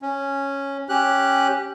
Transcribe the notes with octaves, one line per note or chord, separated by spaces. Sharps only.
C#4
C#4 G4 F#6